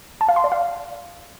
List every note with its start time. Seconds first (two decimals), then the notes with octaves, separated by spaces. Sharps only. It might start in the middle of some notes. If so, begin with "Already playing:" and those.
0.21 A5
0.29 F5
0.36 C6
0.44 D5
0.52 F5